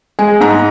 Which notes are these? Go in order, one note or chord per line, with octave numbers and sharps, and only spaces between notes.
G#3 G#5
G#2 A#5